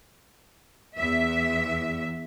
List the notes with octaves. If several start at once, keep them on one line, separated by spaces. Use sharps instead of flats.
E2 E5